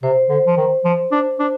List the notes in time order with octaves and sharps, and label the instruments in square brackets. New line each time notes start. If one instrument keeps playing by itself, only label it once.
[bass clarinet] C3 [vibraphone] C5
[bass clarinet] D3
F3
D#3
F3
D4
D4